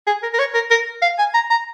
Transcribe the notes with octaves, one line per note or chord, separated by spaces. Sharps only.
G#4
A#4
A#4
C#5
A#4
A#4
F5
G#5
A#5
A#5